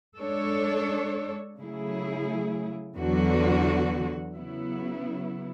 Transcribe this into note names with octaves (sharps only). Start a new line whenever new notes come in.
G#3 D4 A4 C#5
C#3 F#3 A3 E4 G#4
E2 D3 F#3 B3 F#4
C#3 F#3 B3 E4